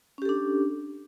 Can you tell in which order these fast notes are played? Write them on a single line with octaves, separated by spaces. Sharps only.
C#4 G4 A4 D4